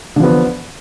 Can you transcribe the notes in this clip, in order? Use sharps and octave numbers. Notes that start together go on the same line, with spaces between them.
D3 F3 B3